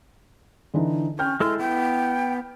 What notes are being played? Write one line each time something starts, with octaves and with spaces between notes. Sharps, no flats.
D3 E3 D#4
C#4 G5 F6 G6
G#3 E4 A4 C6 F6
B3 G5